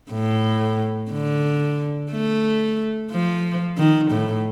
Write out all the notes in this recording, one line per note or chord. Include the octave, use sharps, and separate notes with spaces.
A2
D3
A3
F3
D#3
A2